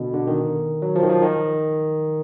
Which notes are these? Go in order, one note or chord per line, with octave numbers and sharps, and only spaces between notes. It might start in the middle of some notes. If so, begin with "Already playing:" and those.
Already playing: B2 D3
D3
D#3
F#3
F3
D#3
F3
D#3